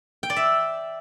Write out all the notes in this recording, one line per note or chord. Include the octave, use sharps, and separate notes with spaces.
G5
D5
E5